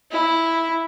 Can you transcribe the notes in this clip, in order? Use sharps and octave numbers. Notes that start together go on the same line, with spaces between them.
E4